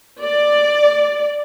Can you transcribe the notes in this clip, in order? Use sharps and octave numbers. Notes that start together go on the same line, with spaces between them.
D5